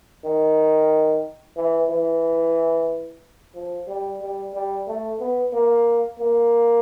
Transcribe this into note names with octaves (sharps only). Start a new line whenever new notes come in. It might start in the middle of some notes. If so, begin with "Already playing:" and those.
D#3
E3
E3
F3
G3
G3
G3
A3
B3
A#3
A#3